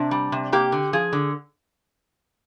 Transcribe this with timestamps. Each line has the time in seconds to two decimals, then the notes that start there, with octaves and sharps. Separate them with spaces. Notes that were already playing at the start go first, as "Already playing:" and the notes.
Already playing: C3 D4
0.11 G3
0.32 C3
0.52 A#3 G4
0.72 D3
0.93 F3 G#4
1.13 D3